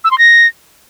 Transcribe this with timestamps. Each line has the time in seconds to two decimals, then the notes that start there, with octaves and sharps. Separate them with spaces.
0.04 E6
0.11 C6
0.18 A#6